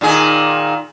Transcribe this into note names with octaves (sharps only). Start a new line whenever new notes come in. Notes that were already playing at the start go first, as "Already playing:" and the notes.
A#2 D#3 G#4